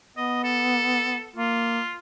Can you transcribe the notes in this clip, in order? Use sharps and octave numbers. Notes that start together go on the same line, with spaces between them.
B3 D#5
A4
A#3 F4